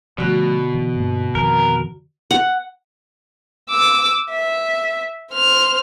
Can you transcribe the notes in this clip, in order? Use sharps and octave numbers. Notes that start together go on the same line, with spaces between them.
B2 D3 F3 A3 F#4
E3
G2 A#3
F2 D#3 F3 A#4
F#5
D6 E6
E5
C5 F6